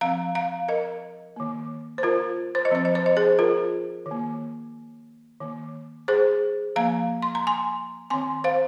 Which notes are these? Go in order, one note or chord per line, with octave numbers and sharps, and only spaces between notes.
F3 C4 F5 A#5
F5 A#5
A#4 D#5
D#3 A#3
C5
F4 A#4
C5
D#5
F3 C4 C5
D#5
C5
D#5
G#4 C5
F4 A#4
D#3
A#3
D#3 A#3
G#4 C5
F3 A#3 F5 A#5
C6
A#5
G#5 C6
D#3 C4 G#5 C6
C5 F5